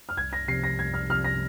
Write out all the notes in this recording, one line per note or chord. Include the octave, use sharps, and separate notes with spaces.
F6
C2 G#6
A#6
C3 F3 C7
A#6
C2 G#6
F6
C3 F3 F6
A#6